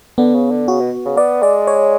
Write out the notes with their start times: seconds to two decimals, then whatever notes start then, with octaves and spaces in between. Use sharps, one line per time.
0.18 D3 B3
0.35 C#3
0.51 D3
0.68 C#3 F#4
0.80 B2
1.05 C#3
1.17 B3 D5
1.43 G#3 D5
1.67 C#5